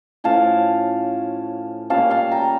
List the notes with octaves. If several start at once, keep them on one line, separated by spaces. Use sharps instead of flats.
A2 F3 C#4 F5 A5
A#2 G3 C#4 F5 A5
F5 A5
G5 A#5